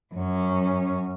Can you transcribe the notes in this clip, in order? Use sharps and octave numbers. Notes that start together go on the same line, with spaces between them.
F#2 C#4